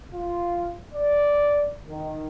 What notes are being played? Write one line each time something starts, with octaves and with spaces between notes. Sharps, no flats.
F4
D5
D#3